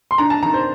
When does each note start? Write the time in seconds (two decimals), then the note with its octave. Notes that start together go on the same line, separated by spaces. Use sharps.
0.11 C6
0.18 D4 A#5
0.30 A5
0.42 D#3 A#5
0.54 C5